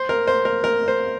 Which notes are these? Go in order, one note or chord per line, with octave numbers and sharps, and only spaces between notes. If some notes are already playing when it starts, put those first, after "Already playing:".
Already playing: C5
A#4
C5
A#4
A#4
C5